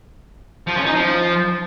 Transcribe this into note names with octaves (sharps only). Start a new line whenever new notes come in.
F3
C#4
D#4
F3